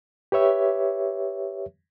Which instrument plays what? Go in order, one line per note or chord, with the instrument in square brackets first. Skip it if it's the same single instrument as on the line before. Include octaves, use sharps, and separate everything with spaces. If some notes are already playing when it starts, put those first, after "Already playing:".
[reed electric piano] G4 B4 C#5 E5